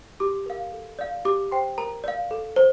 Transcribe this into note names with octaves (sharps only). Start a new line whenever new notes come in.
G4 D6
A#4 F5
A4
D5 F5
G4 D6
C5 G5 C6
A#4 A#5
D5 F5
A4
C5